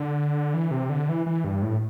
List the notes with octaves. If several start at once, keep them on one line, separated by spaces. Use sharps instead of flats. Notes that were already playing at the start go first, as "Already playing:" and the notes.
Already playing: D3
E3
C3
D3
E3
E3
G2
A2